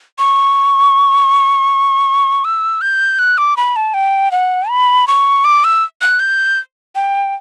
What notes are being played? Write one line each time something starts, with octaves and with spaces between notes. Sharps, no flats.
C#6
E6
G6
F#6
D6
B5
A5
G5
F#5
B5
C#6
D6
E6
F#6
G6
G5